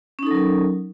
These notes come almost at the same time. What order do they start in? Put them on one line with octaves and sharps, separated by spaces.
C#4 D#4 A4 F#3 A#4